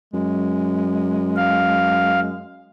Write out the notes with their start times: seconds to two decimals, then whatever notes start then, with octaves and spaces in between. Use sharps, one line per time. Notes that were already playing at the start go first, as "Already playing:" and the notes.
0.14 F#2 G#3
1.36 F5